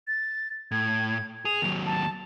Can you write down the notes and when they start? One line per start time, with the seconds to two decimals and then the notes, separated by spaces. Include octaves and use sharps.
0.07 A6
0.71 A2 G#6
1.45 G#4 F7
1.62 D#2 F#3
1.86 A5